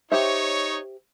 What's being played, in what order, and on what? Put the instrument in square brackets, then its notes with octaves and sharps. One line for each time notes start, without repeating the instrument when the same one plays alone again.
[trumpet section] D#4 C#5 [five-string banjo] G4 C5 E5